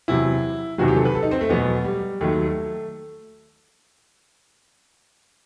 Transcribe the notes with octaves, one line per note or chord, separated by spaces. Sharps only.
E2 C3 F#3 E4
E2 C3 D#3 F#3 F#4
G4
A4
B4
A4
D#4
C4
A3
E2 B2 F#3 B3
G3
D#2 D#3 F#3 A3